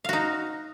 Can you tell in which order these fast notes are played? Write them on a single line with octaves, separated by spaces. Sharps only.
F5 F#4 D#4